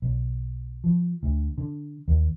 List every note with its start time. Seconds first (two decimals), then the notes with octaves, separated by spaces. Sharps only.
0.02 B1
0.84 F3
1.23 D2
1.58 D3
2.08 D#2